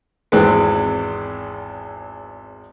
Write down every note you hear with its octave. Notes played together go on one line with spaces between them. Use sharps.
G#1 E2 G#3 C4 B4